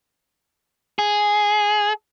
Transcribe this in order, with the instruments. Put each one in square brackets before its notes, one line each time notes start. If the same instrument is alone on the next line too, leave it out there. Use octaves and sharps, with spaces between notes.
[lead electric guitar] G#4